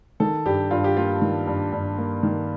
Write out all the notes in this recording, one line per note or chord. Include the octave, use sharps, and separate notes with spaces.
D#3 A4
G2 G4
G2 F4
G4
A#3 F4
D#3
G2
G2
A#3
D#3